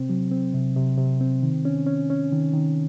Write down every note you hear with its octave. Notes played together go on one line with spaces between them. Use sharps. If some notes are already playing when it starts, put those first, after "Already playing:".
Already playing: C3 C4
F#3
C4
C3
C3
C3
C4
D#3
C#4
C#4
C#4
D#3
D#3